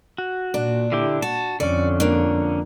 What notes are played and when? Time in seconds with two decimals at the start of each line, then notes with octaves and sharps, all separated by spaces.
0.18 F#4
0.54 A#2 D4
0.92 D3 E4 G4
1.22 F#4 A5
1.60 F2 D3 C#4 D5
2.00 A#3 D4